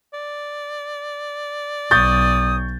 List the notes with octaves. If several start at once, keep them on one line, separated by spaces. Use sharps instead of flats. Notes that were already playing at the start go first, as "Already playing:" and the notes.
D5
B1 C#6 D#6 G6 A6